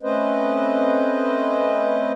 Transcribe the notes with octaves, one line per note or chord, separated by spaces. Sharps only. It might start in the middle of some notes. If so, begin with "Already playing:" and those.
A3 C4 C#4 B4 C5 D#5